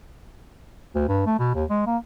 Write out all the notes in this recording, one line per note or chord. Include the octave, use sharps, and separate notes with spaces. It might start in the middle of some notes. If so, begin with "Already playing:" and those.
D2
G2
A3
B2
D#2
G#3
A#3